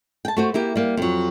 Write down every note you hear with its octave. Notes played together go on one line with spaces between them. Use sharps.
G5 A5
A3 F#4 C5
A#3 E4 G4
G3 A#3
F2 F#3